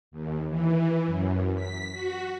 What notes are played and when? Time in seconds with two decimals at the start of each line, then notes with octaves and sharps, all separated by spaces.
0.11 D#2
0.49 E3
1.06 F#2
1.55 B6
1.93 F#4